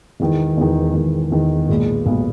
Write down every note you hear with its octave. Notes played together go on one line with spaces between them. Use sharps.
E1 E2 D#3
E1 E2 D#3
E1 E2 D#3
E1 E2 D#3
B1 A#2 G#3 B3
B1 A#2 G#3 B3